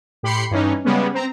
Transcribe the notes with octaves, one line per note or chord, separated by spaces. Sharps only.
A2 G4 B5 C6 C7 C#7
G2 E3 C#4 D#4
C#3 G3 G#3 B3 C#4
C4 A#5